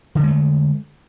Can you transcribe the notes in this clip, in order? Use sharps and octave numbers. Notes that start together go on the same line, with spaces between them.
D3 D#3 G#3 A3